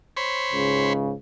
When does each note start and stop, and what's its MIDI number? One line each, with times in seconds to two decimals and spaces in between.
0.17 0.93 72
0.17 0.93 73
0.17 0.93 83
0.53 1.13 37
0.53 1.13 44
0.53 1.13 49